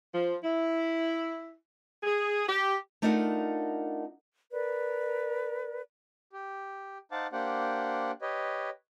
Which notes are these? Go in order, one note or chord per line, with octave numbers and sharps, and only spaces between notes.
F3
E4
G#4
G4
A3 D4 D#4 F4 A#4 F#5
A#4 B4 D5
G4
D#4 C5 F5 F#5 A5 D6
A#3 D4 G4 C5 F#5
G4 B4 C#5 D#5